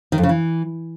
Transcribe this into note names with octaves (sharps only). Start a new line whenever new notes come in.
D#3
F2
C#3
E3